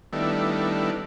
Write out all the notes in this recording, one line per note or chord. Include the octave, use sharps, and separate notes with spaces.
D#3 G3 A3 B3 D4 E4